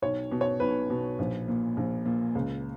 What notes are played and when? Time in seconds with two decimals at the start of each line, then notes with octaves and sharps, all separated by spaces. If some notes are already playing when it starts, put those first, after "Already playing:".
0.02 B1 C#5
0.32 B2
0.41 C#5
0.60 B1 B4
0.90 B2
1.19 A#1
1.48 A#2
1.77 A#1
2.06 A#2
2.35 C#2